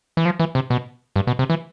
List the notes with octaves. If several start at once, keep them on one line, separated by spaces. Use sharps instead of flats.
E3
F3
E3
C3
B2
G2
B2
C3
E3